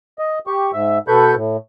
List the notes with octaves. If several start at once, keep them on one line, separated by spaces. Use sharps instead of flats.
D#5
G4 C#6
G#2 E5
B2 A4 B4 B5 C#6 G6
A2